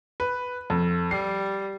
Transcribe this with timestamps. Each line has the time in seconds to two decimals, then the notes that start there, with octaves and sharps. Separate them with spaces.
0.20 B4
0.70 F2
1.11 G3 C7